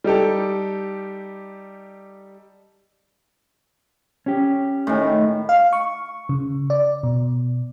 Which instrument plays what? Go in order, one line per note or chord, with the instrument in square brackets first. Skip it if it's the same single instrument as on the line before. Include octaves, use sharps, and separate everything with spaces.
[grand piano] G3 D#4 G4 A4
[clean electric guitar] C#4 G4
[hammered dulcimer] A2 D#3
[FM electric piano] F5
C#6
C#3
D5
B2